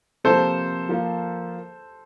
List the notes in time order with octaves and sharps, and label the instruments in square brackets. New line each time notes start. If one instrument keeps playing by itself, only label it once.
[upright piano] C3 F3 A#3 [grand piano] A4 C5
[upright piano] F3 A#3 F4